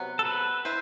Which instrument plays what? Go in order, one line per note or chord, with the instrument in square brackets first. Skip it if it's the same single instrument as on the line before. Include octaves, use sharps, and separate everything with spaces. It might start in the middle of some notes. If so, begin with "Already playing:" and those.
Already playing: [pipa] C3 F#3 B3
[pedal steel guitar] A4
B4
[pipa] E4 B4 [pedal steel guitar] C5